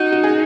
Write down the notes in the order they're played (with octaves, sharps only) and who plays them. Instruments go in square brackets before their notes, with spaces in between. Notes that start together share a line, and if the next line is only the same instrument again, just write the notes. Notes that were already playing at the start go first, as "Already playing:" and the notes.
Already playing: [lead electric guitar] D#4 [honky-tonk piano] F#4
[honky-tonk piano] F#4
G#4